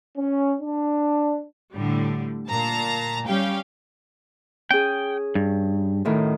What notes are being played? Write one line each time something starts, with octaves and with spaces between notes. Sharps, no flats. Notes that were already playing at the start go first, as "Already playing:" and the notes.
C#4
D4
A2 D3 G3
A#2 A5 A#5
G3 C#4 G4 F5 G5
C#4 G#4 G5
G2
F#2 A2 D#3